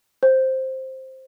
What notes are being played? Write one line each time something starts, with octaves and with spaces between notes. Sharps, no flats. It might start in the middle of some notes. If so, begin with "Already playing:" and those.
C5